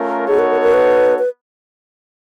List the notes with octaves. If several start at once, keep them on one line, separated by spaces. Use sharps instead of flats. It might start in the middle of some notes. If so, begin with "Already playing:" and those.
Already playing: A3 C#4 F4 A#4
B3 D#4 F#4 G#4 A4 C#5
A#4
A#4
A#4
B4
B4